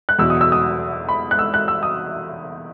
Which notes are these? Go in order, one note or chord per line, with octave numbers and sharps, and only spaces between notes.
F#6
E2 B2 F#3 E6
D#6
E6
D#6
B5
F#6
E6
F#6
E6
D#6